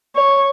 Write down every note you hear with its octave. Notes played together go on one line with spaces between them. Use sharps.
C#5